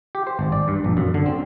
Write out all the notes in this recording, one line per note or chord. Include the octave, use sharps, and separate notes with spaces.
G4
C5
G#1
D5
G2
A#1
F#2
D3
C4